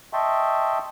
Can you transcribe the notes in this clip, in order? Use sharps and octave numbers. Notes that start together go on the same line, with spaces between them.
D#5 E5 G5 A5 C6 C#6